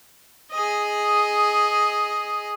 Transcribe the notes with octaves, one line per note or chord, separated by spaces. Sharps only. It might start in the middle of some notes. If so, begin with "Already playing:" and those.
G#4 D#5